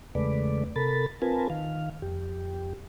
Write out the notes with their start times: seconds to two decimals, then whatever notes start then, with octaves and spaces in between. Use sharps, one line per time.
0.15 E2 C#3 G#3 A3 B4 D5
0.76 C3 A4 A#4 B5 A6
1.22 C4 F4 A#4 B4 G#5 A5
1.50 D#3 F5
2.02 F2 G4